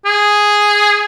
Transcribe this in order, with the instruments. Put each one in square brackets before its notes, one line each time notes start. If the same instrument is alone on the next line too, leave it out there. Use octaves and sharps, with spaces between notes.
[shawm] G#4